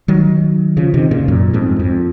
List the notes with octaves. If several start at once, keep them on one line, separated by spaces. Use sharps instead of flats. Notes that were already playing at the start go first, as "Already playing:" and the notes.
D#3 F#3
C#3 F3
C3 D#3
A#2 C#3
F#2 A#2
F2 G#2
F2